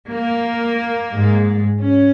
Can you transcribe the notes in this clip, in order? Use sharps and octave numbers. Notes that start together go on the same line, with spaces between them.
A#3
G#2 G#3
C#4